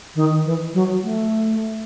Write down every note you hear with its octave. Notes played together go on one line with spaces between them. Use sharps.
D#3
E3
F#3
A3